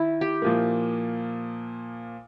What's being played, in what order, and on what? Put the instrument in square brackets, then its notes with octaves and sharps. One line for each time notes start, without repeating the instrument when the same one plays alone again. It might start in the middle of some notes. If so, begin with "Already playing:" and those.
Already playing: [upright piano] D#3 [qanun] E4
[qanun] G4
[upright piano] A#2 F3 A#3